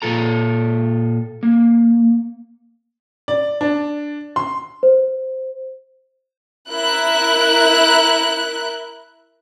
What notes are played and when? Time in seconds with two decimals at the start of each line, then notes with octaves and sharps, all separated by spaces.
0.02 A#2 F4 A4 A#5
1.43 A#3
3.28 D5
3.61 D4
4.36 C6
4.83 C5
6.71 E4 A#4 F#6